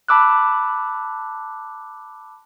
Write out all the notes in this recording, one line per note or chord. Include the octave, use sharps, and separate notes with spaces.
A5 B5 D6 E6 F#6